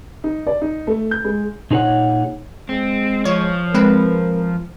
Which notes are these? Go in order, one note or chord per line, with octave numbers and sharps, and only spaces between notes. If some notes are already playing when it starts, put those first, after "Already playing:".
D#4
D5
D#4
A3
G6
G#3
A#2 D#4 G#4 C5 C#5 F#5
G#3 C4
F3 C#5
G#3 C4 A#4 B4